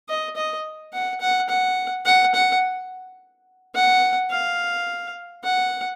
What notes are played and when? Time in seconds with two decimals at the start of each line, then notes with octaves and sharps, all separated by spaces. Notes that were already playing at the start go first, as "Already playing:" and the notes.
0.09 D#5
0.36 D#5
0.93 F#5
1.21 F#5
1.49 F#5
2.05 F#5
2.34 F#5
3.75 F#5
4.31 F5
5.44 F#5